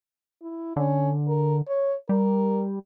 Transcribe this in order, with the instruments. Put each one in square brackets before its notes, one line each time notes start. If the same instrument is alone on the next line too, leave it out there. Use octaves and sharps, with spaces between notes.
[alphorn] E4
[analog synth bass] D3 [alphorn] C#4
[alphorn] A#4
C#5
[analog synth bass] G3 [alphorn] A#4